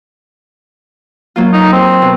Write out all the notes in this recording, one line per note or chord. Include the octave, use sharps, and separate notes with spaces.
F#3 A#3 F4
D#4
C4
B2